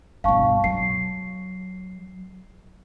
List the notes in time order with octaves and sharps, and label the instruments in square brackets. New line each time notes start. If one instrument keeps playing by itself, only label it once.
[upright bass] G2 B2 [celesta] F5 A5 C#6
[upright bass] F#3 [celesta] C7